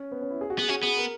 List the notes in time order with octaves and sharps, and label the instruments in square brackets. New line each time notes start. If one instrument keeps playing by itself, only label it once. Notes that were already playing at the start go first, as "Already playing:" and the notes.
Already playing: [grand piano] C#4
B3
C#4
E4
G#4
F#4
[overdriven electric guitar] B3 [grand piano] G#4
[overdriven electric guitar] C#4 [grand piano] F#4
[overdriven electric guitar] B3 [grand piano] G#4
[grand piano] A#4